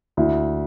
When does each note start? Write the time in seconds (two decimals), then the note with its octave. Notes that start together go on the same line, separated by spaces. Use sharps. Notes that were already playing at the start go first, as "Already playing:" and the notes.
0.17 D2 E4